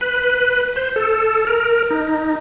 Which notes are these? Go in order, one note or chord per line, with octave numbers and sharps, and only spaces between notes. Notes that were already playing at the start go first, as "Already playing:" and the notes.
B4
C5
A4
A#4
D#4